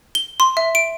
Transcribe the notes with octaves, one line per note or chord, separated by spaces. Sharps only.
G7
C6
E5
D7